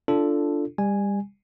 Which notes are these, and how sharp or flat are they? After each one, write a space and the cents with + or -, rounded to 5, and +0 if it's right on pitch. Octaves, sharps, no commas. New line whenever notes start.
D4 -10 F4 -25 A4 +0
G3 +30 G#5 -5